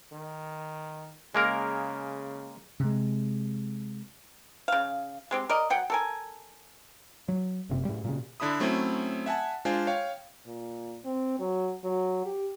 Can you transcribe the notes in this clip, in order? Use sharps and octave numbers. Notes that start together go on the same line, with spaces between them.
D#3
C#3 G#3 A#3 A#4
C3 G#3
C#3 F5
G#3 C4 G4
A#4 D5 D#5
F#3 F#5 G5
A4 A#4 G#5
F#3
F#1 C3
A2 G3
A#2 C#3
D3 D4 E4 B5 D#6
F#3 A3 C4 C#4 E4
E5 F#5 G#5 A5
G#3 D4 F4 C5 D5 G#5
C#5 F5 G5
A#2
C4
F#3
F#3
G4